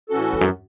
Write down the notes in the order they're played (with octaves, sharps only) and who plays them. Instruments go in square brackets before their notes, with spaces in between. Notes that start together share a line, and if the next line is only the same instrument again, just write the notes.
[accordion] A2 E3 C#4 F#4 A4
[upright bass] E2
F#2